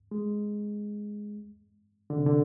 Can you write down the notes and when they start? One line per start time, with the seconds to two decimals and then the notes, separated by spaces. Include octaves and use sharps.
0.11 G#3
2.10 D3
2.18 C3
2.26 D3